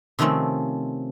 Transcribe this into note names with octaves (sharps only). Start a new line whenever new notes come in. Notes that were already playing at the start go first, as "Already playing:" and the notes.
C3 D#3 F3 A3 C4 C#4